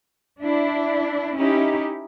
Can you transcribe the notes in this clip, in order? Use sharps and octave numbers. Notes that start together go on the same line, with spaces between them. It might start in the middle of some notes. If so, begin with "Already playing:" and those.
D4 E4
C#4 D#4 E4 G4